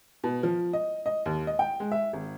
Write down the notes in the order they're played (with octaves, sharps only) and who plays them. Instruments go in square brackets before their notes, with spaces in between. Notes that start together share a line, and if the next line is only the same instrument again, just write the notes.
[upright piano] B2
F3
D#5
D#5
D#2
D#5
G5
G#3
E5
G#1